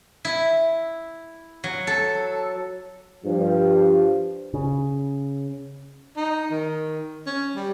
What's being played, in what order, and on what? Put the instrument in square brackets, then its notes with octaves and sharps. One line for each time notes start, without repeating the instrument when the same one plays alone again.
[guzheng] E4
F#3
A4
[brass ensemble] G2 F3
[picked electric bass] C#3
[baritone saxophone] D#4
D#3
C#4
G3